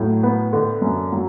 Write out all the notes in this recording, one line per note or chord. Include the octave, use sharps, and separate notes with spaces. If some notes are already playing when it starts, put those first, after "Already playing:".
Already playing: A2 F#3
B3
D3
F#2
F#3